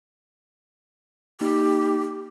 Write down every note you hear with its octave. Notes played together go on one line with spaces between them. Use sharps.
A#3 D#4 G4